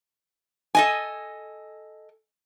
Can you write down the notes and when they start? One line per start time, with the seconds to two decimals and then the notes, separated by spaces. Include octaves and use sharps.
0.75 A4 D#5 G#5